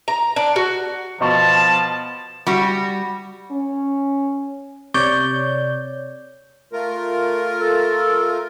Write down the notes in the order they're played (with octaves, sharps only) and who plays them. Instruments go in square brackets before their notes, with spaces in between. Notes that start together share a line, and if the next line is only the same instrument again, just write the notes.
[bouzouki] A#5
D4
F#4
[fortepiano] B2 C#6 [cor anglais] F3 [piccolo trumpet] A5
[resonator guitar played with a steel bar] G3 F#4
[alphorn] C#4
[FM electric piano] C3 C#5 D5 G6
[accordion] A3 F4 A#4
[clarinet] A4